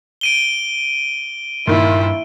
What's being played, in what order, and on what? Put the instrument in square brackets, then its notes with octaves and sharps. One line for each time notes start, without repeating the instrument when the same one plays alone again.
[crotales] D7 D#7 G7
[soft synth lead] G2 [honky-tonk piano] A#2 D#3 [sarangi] E4